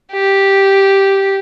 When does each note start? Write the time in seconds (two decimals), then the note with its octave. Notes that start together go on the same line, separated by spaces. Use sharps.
0.12 G4